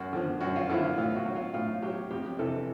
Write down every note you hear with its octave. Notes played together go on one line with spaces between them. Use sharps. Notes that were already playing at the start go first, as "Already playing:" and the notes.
Already playing: F#2 F#4
D3 F3
F#2 F#4
F4
D3 F3 E4
F4
A2 F4
F#4
F#3
F4
A2 F4
F#3 G4
F2 G4
C3 E3 A4